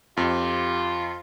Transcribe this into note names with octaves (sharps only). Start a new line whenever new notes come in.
F2 F4 G4